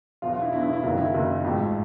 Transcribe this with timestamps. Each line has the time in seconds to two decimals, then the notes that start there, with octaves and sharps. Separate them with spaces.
0.22 E2 B2 F#3 F4
0.32 F4
0.42 E4
0.52 E2 B2 F#3 E4
0.63 E4
0.73 E4
0.83 F#1 F#2 D#3 F#3 F4
0.98 E4
1.13 F#1 F#2 D#3 F#3
1.44 A1 G#2 F3